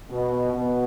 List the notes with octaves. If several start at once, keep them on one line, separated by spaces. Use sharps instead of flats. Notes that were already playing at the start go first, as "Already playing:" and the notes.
B2
B2